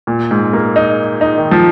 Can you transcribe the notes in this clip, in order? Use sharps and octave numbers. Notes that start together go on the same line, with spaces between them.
A#2
G#2
A#3
D#4
D#4
D#3
F3